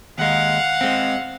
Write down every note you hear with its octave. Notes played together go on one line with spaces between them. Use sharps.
D#2 G#3 F5 F#5
G#3 C4